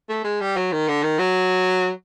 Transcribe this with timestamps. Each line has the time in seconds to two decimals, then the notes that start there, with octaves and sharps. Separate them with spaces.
0.09 A3
0.24 G#3
0.41 G3
0.57 F#3
0.72 D#3
0.88 D3
1.03 D#3
1.19 F#3